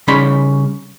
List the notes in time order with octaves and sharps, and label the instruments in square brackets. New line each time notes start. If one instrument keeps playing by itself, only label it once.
[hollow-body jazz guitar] C#3 G3 C#4 D#4 B5 C6